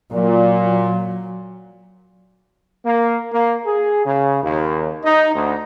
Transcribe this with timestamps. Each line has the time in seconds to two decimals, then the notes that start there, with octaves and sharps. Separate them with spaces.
0.12 A#2 F#3
2.85 A#3
3.33 A#3
3.66 G#4
4.05 C#3
4.43 D#2
5.04 D#4
5.34 D2